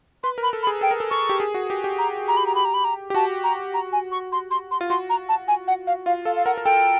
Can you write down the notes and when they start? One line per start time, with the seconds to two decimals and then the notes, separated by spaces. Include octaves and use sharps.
0.23 B4 C6
0.38 A#4
0.43 B5
0.53 A4
0.63 B5
0.67 G#4
0.81 A4 G5
0.91 A#4
1.00 A4
1.11 A4 C#6
1.29 G4
1.40 G#4
1.54 F#4
1.70 G4
1.84 G4
1.98 A#5
2.28 A#5
2.37 B5
2.46 A#5
2.55 B5
2.65 A#5
2.74 B5
2.84 A#5
3.10 G4
3.14 F#4 A5
3.44 A#5
3.74 A#5
3.93 G#5
4.12 C#6
4.32 C6
4.51 C6
4.71 C6
4.81 F4
4.90 F#4 C6
5.10 A#5
5.29 A5
5.48 G#5
5.68 F#5
5.87 F5
6.06 F4 F5
6.25 A4 F5
6.36 F5
6.46 A#4 F#5
6.58 A#4
6.65 A4 G5